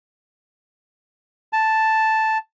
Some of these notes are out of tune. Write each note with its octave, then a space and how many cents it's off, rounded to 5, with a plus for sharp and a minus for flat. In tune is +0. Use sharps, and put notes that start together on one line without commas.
A5 +0